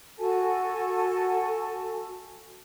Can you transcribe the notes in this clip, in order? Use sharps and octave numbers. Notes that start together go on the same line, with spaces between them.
F#4 A4 G#5 A5